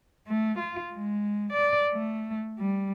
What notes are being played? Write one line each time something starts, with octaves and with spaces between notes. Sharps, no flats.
A3
F4
G#3
D5
A3
G3